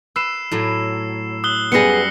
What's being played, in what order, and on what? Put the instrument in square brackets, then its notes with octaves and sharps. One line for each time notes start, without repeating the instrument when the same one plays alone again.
[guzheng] B4 [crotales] E6 C7 E7
[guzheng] A2 F#3
[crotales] D#6 F#6 G7
[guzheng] F#2 G3 [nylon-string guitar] B3 G#4 [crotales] A#6 C7 C#7
[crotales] D#6 C7